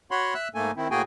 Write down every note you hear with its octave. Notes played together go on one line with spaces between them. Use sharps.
F#4 C#5 F#5 B5 C6
E5 E6 F#6
G#2 A3 A#3 A4 G#5
D#3 C4 E4
A2 A#3 F#4 G#4 G5 G#5